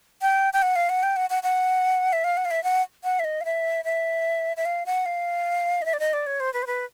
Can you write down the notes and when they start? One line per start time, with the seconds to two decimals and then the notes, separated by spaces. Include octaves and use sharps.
0.22 G5
0.53 G5
0.62 F#5
0.76 F5
0.89 F#5
1.03 G5
1.16 F#5
1.30 F#5
1.43 F#5
2.13 E5
2.24 F5
2.37 F#5
2.45 F5
2.51 E5
2.64 F#5
3.04 F#5
3.20 E5
3.24 D#5
3.41 F5
3.45 E5
3.85 E5
4.57 E5
4.65 F5
4.86 F#5
5.06 F5
5.82 D#5
5.86 E5
5.93 D5
6.00 D#5
6.13 D5
6.26 C#5
6.40 C5
6.54 B4
6.63 C5
6.67 B4